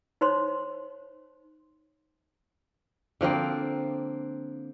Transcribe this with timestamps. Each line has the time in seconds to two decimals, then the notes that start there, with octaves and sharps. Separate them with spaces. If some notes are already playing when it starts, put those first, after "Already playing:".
0.21 D#4 C5 C#5 C6
3.21 D3 F3 A#3 C4